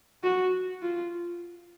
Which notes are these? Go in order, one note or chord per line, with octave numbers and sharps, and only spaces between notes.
F#4
F4